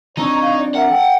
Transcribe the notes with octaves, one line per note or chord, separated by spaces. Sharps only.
F3 C4 D4 D#4 C#5 A#5
F5
D5
A#4 E5 F#5
A4 G5